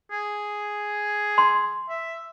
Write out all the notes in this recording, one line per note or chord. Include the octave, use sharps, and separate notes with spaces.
G#4
C6
E5